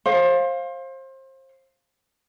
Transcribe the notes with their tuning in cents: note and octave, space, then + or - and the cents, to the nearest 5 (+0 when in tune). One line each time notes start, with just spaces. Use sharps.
C5 +30 F5 +0